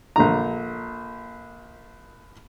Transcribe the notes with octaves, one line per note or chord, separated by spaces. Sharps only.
A#1 D3 A#5